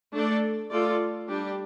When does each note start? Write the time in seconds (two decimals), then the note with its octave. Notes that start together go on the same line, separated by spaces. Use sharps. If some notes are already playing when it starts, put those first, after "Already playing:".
0.13 A3 D4 A4 D5
0.70 A3 F4 A4 D5
1.28 G3 D4 G4